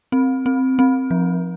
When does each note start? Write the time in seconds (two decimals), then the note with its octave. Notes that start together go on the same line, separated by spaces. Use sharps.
0.12 C4
0.46 C4
0.79 C4
1.11 F3